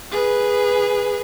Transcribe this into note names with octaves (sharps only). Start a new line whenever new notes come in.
G#4 B4